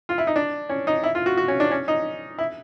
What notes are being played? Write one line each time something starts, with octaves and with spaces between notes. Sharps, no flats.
F4
E4
D#4
D4
C#4
D#4
E4
F4
F#4
F#4
C#4
D4
C#4
D#4
E4